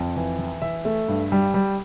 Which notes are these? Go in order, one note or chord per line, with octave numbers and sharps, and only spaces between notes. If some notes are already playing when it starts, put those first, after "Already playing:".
Already playing: F2
E3
E3
E3 E5
A3
G2
G3
G3